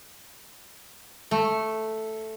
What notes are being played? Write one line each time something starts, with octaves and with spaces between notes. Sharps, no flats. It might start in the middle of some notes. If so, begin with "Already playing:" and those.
A3